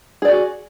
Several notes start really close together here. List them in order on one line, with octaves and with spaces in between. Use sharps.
G#4 D5 F#4